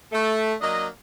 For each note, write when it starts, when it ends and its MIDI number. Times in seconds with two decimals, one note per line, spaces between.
0.12 0.54 57
0.61 0.85 54
0.61 0.85 58
0.61 0.85 62
0.61 0.85 75